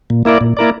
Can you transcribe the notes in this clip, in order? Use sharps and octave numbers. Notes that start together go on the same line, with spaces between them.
A#2
A#3 E4 A#4 D5
A#2
A#3 E4 A#4 D5